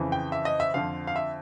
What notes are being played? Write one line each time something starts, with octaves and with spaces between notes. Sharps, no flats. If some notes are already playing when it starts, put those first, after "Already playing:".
Already playing: F2 C#3 E3
G5
E5
D#5
E5
F2 D3 F3 F5
F5
E5